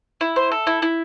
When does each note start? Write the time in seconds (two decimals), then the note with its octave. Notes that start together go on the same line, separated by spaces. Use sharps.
0.21 E4
0.36 C5
0.51 A4
0.67 E4
0.82 E4